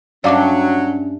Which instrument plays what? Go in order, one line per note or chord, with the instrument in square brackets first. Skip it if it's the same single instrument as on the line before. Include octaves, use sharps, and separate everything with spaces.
[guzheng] G2 A3 D4 [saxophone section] F#3 [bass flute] C#4 [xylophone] D5 F5 D6